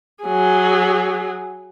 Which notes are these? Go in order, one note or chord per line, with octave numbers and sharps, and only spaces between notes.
F#3 G#4